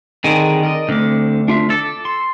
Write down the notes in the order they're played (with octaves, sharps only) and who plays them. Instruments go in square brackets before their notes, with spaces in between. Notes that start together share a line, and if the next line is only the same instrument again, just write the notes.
[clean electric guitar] D3 D#3 [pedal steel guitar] C4 G#4 G#5
[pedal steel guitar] A#4 D5 D#5
[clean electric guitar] D2 [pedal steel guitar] D3 C4 D6
[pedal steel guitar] D4 F4 E5
[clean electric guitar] A4 [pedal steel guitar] D6
[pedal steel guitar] C6